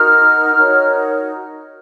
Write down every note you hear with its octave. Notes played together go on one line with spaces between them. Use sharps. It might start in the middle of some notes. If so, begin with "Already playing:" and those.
Already playing: D#4 F#4 A#4 F6
D#4 F#4 A#4 C#5